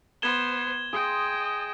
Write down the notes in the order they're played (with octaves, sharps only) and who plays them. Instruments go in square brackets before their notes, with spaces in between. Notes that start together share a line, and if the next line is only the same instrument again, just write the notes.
[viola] B3 C5 [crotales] G#6 E7 G7
[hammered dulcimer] G#4 C6 [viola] D#5 G5